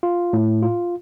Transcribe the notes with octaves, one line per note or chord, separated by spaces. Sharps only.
F4
A2
F4